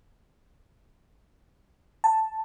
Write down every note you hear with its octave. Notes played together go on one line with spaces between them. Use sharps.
A5